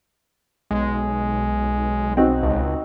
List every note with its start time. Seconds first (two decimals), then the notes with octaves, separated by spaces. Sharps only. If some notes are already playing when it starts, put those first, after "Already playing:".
0.71 B1 G#3
2.17 C4 D#4 F#4
2.43 C#2